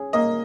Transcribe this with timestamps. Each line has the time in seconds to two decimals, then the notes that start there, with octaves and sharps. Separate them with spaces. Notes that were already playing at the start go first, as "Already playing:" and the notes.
Already playing: C#4 G#4
0.13 A#3 D#5